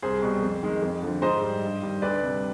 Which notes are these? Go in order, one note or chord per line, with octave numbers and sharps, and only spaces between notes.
C2 G#4 C5
B2 G3
F2
D#3 G#3
F2
D3 F3
G#2 C5 D#5
G3
G2
D#3 G3
D2 B4 D5
C3 G3